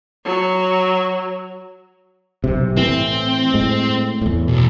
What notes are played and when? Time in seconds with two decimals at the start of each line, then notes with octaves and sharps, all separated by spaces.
0.25 F#3
2.44 B1 G2 C3
2.77 A2 E3 C4
3.54 A2 G#3
4.21 E2 A2
4.48 B1